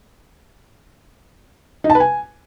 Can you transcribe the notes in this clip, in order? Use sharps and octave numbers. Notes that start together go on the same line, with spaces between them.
D#4
A5
B4
G#5